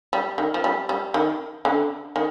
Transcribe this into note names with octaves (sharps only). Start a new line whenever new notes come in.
G3
D#3
F3
G3
G3
D#3
D3
D#3